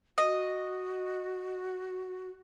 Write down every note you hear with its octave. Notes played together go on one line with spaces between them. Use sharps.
F#4 D#5